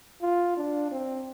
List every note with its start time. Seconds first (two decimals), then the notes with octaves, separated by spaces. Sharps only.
0.22 F4
0.57 D4
0.92 C4